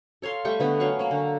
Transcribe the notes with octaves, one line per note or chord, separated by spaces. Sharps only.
A4 C#5 F5 C6
G3 A3 G5 C#6
D3 B3
F#3 C#4 F5 C#6
A#3 C#4
D3